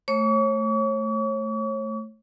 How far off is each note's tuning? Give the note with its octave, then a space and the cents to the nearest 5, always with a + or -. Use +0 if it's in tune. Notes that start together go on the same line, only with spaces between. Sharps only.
A3 +0 C#5 -30 C#6 +45